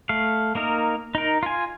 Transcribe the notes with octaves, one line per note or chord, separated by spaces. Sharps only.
A3 F5
A#3 D#4 A#4
D#4 A#4
F4 G#5